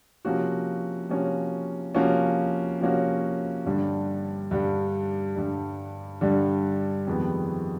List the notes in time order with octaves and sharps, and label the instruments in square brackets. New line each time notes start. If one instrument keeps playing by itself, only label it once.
[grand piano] C3 F3 A#3 C#4 F#4
C3 F3 A#3 C#4 F#4
C3 F3 A#3 C#4 F#4
C3 F3 A#3 C#4 F#4
G2 D3 G3
G2 D3 G3
G2 D3 G3
G2 D3 G3
F2 C3 D#3 G#3 B3